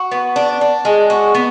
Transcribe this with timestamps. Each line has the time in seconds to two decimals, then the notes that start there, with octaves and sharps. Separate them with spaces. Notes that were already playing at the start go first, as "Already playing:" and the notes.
Already playing: F#4
0.12 B3
0.36 D4
0.61 D4
0.85 G#3
1.10 F#4
1.35 B3